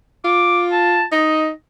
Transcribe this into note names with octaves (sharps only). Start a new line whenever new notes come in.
F4 D6
A5
D#4 D#5